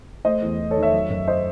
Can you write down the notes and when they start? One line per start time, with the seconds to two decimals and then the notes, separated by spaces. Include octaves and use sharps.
0.25 A3 C5 D#5
0.42 E2
0.60 E2
0.71 A4 C#5
0.76 D#3
0.82 C#5 E5
0.93 F#3
1.10 F#2
1.28 C5 D#5